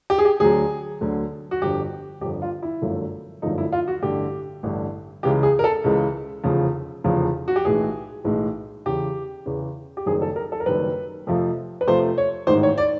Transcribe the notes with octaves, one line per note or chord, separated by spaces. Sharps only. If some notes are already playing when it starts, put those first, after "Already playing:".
G4
G#4
G4
D2 D3 F#3 G#4
D2 D3 F#3
F#4
G1 F2 D3 G4
G1 F2 D3 G4
F4
E4
G1 F#2 D3 F3 A3
G1 F#2 D3 F3 A3 D#4
E4
F4
F#4
A1 G2 D3 G4
A1 G2 D3
C#2 C#3 E3 G#3 G4
G#4
A#4
A4
C#2 C#3 E3 G#3
F1 E2 C#3 F3
F1 E2 C#3 F3
F#4
G4
B1 A2 E3 G#3 G#4
B1 A2 E3 G#3
E2 C#3 E3 G4
E2 C#3 E3
G4
F#1 F#2 D#3 G3 G#4
A4
A#4
A4
A#4
F#1 F#2 D#3 G3 B4
F2 C3 F3 A3
B4
F2 C3 F3 A3 C5
C#5
A1 G#2 D#3 C5
C#5
D5